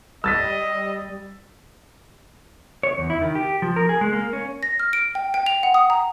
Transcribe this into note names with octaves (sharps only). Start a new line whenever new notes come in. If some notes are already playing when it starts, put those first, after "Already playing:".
G3 D#5 E6 A6 B6
C#5
E2
E4
D#3
G4
F3
A#4
G#4
G#3
A#3
C#4
A#6
F6
D7
G5
G5
F7
F#5
D#6
A#5